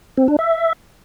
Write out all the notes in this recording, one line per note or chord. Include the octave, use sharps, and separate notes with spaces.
C4
D4
E5